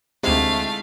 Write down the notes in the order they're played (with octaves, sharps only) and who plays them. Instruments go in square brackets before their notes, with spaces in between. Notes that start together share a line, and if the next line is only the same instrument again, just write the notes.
[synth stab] D2 C3 [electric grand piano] G#3 D#4 E4 [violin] A3 F5